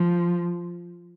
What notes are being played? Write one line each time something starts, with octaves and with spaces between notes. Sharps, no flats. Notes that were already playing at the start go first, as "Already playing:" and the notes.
Already playing: F3